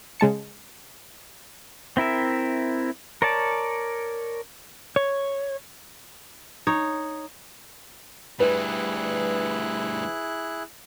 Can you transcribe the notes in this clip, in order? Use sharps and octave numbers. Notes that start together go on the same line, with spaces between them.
C#3 G#3 A5 C#7
C4 E4 A#4 E5
A#4 C#5 D5 A5
C#5
D#4 C#5
D2 G3 E4 G#4 B4 F#6